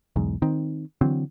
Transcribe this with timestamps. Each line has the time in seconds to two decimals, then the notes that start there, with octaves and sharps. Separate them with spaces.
0.16 B1 E2 G#2
0.42 D#3 C4
1.01 D3 E3 F#3 C4